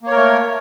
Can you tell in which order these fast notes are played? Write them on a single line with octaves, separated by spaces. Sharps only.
A#3 C#5 A#4 A3